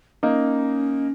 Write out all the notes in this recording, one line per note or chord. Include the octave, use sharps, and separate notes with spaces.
A#3 C#4 D#4